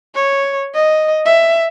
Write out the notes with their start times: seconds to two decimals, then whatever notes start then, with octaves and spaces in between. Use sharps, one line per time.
0.15 C#5
0.74 D#5
1.25 E5